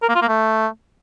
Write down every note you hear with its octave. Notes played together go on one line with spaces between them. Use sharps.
A#4
A#3
F4
A#3
A3